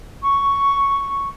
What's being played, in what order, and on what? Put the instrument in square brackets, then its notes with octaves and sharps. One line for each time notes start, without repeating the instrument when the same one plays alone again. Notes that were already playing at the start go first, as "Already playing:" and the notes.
[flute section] C#6